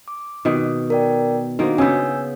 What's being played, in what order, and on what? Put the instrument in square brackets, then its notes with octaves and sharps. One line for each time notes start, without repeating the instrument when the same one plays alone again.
[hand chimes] D6
[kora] B2 D#3
[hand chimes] A#4 D5 G5
[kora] D#3 A#3 [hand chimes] D4 F#4 C5
[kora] C#3 B3 [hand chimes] G#5 E6 G6